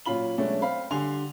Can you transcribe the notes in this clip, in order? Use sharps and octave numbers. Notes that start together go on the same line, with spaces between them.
A#2 F#3 C#4 F4 B5 F#7
B2 F#3 G#3 A3 C#4 D4
C4 F5 B5
D3 G3 G#5 C6 F7